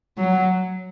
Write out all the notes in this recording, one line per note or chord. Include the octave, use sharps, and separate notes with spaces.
F#3